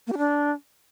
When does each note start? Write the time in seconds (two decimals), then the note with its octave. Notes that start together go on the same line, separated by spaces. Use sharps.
0.07 A#3
0.12 G4
0.18 D4